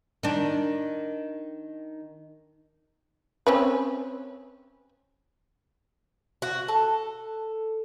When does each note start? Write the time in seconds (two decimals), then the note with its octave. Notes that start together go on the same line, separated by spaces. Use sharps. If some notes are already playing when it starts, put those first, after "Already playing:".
0.23 D#3 D4
3.47 C4 C#4 B4
6.42 F#4
6.68 A4